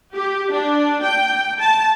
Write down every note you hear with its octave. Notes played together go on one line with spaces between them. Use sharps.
G4
D4
G5
A5